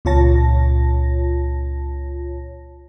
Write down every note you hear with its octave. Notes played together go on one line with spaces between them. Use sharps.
C#2 A#2 F4 C#5 A5 A#6